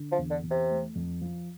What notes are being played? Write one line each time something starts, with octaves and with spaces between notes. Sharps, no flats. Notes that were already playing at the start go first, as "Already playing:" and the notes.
Already playing: D3
F3
E2
D3
E2
C3
A3
F2
F3